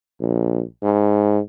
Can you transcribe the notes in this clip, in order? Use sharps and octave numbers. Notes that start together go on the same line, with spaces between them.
A#1
G#2